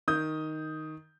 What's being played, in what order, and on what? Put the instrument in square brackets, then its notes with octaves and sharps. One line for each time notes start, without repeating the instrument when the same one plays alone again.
[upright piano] D#3 D#6 G6